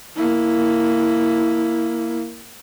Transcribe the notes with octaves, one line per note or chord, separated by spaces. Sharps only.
A#3 E4